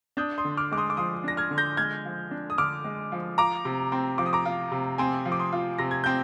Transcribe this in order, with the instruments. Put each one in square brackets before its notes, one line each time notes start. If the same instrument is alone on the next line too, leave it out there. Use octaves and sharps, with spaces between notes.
[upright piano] D4 [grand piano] D#6 G6
[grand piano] C6 D#6
[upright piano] D3
[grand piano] D6 F6
[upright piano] G#3 [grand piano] D6
[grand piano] C6 D#6
D6
[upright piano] F3 [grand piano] C6 D#6
[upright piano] D4 [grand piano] A#6
[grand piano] F6 G#6
[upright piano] D3
[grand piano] G6 A#6
[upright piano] G#3 [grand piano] F6 G#6
[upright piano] F3
D4
[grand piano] D#6
[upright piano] D3 [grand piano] D6 F6
[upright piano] G#3
F3
[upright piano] F4 [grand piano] A#5 D6
[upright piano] C3
C4
[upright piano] F3 [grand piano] D6
[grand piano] D#6
A#5 D6
[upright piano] F4
C3
[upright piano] C4 [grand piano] G#5 C6
[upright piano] F3
[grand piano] D6
C6 D#6
[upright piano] F4
[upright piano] C3 [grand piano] A#6
[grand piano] G#6
[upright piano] C4 [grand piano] G6